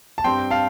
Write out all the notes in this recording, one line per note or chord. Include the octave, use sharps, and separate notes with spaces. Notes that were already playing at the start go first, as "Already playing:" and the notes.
A5
G2 G3 C4 G5 C6
F5 A5